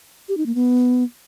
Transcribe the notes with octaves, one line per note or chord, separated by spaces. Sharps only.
G4
D#4
A#3
B3